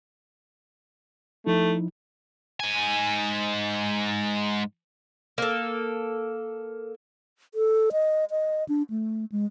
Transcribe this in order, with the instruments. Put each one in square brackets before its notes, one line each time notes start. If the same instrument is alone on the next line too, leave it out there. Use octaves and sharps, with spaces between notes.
[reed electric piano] F3 D#4 E4 [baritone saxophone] A3
[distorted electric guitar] G#2 G#5
[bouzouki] A#3 A4
[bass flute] A4
D#5
D#5
D4
A3
G#3